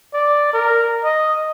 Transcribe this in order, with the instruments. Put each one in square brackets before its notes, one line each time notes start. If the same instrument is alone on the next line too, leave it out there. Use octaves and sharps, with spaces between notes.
[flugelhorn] D5
A#4
D#5